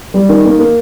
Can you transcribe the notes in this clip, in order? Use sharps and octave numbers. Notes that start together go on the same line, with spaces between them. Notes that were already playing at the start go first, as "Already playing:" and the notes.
G3
D#3
A#3
A#3